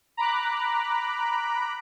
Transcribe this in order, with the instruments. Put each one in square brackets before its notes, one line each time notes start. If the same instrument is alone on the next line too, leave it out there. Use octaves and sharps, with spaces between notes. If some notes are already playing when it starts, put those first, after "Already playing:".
[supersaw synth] A#5 B5 D6 F#6